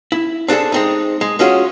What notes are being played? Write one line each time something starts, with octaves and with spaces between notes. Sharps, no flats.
E4
C4 D4 F4 G#4 A4
G#3 C4 D#4
G#3
G#3 C#4 F4 F#4 G#4